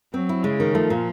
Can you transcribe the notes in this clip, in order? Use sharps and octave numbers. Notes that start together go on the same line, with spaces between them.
F#3 C4
E4
C#3 G#3
D#3
F3 A3
A#2